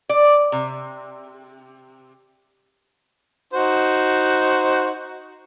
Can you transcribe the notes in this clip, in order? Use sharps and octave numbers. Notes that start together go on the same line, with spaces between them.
D5
C3
D#4 F#4 C5